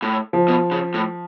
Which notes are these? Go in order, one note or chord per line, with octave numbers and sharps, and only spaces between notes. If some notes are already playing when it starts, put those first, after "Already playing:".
A2
F3
B2
C#3
A2